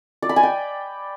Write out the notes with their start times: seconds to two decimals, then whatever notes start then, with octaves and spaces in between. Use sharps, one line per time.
0.22 D5
0.29 B5
0.36 G#5
0.43 G5